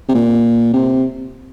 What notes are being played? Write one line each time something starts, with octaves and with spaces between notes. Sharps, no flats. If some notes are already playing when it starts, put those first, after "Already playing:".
C3
A#2
C3